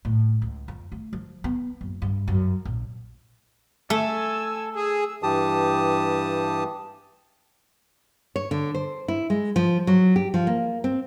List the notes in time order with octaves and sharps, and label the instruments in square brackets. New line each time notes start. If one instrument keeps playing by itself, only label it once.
[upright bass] A2
C#2
F2
A3
F3
B3
F#1
G2
F#2
A#1
[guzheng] A3 [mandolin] A4 [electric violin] G#5 E6
[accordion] G#4 [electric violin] E6
[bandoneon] G2 E3 G4 A5 D#6
[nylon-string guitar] C#5
D3
C5
E4
G#3
F3
F#3
G4
F3
A#3
C4